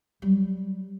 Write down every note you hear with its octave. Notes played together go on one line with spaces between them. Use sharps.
F#3 G3